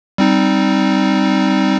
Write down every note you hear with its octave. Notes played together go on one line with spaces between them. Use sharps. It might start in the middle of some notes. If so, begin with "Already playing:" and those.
G3 C4 D#4